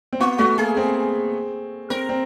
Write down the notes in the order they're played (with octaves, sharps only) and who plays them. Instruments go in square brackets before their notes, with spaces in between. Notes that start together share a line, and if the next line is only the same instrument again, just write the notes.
[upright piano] C4
[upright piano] B3 [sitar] F4
[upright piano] A3 [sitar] F#4
[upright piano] A#3 [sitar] G#4
[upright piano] C4
[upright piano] C4 [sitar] A#4
[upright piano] C4